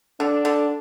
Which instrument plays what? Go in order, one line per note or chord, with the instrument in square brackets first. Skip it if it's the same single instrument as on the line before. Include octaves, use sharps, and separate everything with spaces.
[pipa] D3 [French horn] D4
[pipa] D3